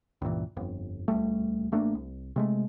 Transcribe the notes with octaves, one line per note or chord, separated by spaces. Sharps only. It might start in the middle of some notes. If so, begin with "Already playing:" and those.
C#2 G2 A#2 E3
G1 F2
D#1 C#2 G3 A3
A1 A3 A#3 D4
C2
C3 G#3 A3